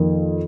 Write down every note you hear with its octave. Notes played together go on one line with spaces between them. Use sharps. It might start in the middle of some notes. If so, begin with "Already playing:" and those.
Already playing: F2 D#3 A#3